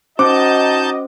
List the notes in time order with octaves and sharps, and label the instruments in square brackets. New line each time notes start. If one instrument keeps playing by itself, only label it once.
[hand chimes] C#4 C5 [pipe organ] D#4 A5 G6 [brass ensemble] F#4 D#5 [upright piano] D6